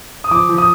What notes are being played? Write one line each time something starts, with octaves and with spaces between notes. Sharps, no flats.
D#6
F3 D6
F3
D#6